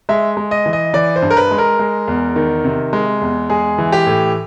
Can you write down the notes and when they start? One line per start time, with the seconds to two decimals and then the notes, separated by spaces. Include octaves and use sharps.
0.09 G#3 E5
0.37 G#3
0.51 D#5
0.66 E3
0.73 D#5
0.94 E3 D5
1.16 C5
1.22 G2
1.30 A#4
1.37 B4
1.51 G#3
1.58 A#4
1.79 G#3
2.08 E2
2.36 D#3
2.64 C3
2.93 G#3
3.21 E2
3.50 G#3 G#4
3.78 E3
3.92 G4
4.07 A2